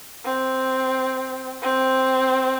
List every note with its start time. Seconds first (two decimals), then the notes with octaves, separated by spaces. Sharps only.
0.24 C4
1.62 C4